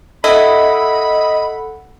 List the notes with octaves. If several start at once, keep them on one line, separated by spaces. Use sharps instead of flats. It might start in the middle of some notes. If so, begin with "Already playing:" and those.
E4 A4 D#5 F#5 B5